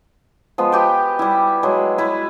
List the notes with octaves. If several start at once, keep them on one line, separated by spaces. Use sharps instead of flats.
F3 G#3 B3
B3 G4 G5
G3 E4
F#3 G#3
E4 B4